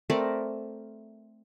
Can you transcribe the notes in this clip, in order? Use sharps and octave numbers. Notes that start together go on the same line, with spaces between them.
A3 C4 A#4 D5